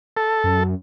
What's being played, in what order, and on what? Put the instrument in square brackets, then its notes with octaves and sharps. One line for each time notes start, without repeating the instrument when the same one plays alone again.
[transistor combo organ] A4
[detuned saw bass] F#2